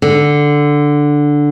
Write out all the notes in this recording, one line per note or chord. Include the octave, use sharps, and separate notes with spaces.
D3